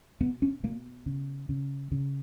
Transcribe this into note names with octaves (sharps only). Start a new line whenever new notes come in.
B2 B3
C#4
B2 A#3
C#3
C#3
C#3